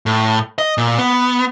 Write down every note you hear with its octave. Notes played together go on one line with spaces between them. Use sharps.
A2
D#5
A#2
B3